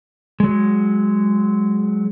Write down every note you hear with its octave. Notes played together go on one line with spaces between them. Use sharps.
F#3 G#3